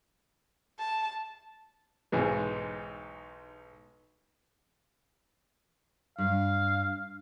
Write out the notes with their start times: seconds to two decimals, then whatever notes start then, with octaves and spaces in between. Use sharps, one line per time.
0.79 A5
2.12 B1 G#2 E3 G#3
6.18 G2 F5